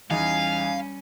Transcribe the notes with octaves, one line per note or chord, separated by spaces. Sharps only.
E2 G3 C#4 D#4 F5 G#5